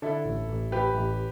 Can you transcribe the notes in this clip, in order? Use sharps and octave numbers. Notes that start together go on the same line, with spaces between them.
D3 E4 A4
A1
A1
A1 G4 B4
A1